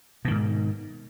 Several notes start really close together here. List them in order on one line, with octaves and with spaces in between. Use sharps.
B2 D#3 G#2